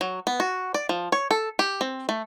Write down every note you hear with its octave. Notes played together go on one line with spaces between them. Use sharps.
F#3
B3
F#4
D5
F3
C#5
A4
G4
C4
A3